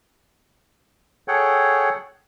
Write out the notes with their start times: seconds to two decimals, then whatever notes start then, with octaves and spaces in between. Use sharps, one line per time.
1.28 G#4 A4 C#5 F#5 G5